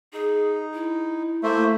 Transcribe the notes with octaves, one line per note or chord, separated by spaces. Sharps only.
D#4 G#4
E4
A3 A#3 E4 C5 E5